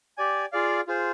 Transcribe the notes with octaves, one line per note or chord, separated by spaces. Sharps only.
G4 D5 G#5
F4 G#4 D5 F5
F4 G#4 C5